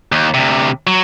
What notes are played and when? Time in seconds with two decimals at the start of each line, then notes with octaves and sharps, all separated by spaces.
0.12 D#2
0.34 D2 C3
0.87 F#3